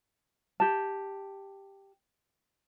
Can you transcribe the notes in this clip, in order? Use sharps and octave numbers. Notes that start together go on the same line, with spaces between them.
G4 A5